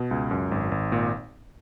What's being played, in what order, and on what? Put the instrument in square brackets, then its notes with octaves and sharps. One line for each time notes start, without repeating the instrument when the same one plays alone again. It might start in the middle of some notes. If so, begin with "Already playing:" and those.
Already playing: [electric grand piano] B2
C#2
F#2
G#1
G#1
A#2